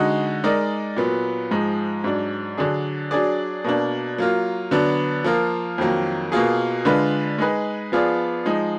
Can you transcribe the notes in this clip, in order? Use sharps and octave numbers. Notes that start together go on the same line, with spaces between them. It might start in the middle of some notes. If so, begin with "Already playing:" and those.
Already playing: D3 G#3 D#4 F#4
G#3 D#4 A#4 D5
A#2 F#3 B3
G#2 F3 G#3
G#2 F#3 D4
D3 F#3 D4 G#4
F#3 D4 G#4 D5
B2 A#3 D4
F#3 A#3 F4
D3 F#3 B3 D4
F3 A#3 F4 A#4
F2 D#3 F#3 A#3
B2 A#3 F4 G#4
D3 G#3 D4 F4 B4
G#3 D#4 G#4 B4
F3 B3 F4 G#4 D5
F3 G#3 D#4